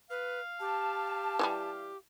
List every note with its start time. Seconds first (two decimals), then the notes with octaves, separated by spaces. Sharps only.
0.10 B4 F5
0.60 G4 A5
1.39 E3 F#3 G3